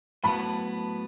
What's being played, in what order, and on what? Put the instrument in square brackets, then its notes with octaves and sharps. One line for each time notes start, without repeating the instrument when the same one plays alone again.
[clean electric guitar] A2 F#3 B3 [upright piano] A5 B5